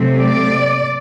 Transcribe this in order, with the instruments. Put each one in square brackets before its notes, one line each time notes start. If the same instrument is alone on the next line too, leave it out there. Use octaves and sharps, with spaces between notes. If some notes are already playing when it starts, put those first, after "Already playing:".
Already playing: [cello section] C3 F#3 A3 C4
D5